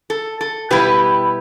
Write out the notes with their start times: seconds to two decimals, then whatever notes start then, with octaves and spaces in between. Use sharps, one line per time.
0.10 A4
0.41 A4
0.71 B2 G3 E4 G4 B4